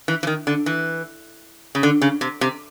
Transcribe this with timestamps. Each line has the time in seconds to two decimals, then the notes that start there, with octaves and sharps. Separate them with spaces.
0.08 E3
0.23 E3
0.27 D#3
0.47 D3
0.66 E3
1.75 C#3
1.83 D3
2.02 C#3
2.21 C3
2.41 C3